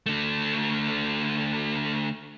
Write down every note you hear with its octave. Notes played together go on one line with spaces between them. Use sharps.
D3 A3